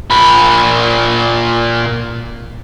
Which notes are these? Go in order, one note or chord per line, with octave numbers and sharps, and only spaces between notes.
A#2 B5